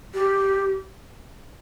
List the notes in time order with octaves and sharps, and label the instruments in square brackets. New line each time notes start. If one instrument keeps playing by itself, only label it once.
[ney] G4